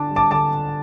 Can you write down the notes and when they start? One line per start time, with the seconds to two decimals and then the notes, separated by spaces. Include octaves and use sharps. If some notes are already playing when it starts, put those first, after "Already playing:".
Already playing: D3 D4 A5 D6
0.10 G3
0.16 A5 D6
0.31 D3 A5 D6